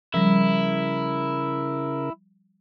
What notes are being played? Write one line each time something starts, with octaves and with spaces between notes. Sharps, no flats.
C#3 F3 G3 E4 A#4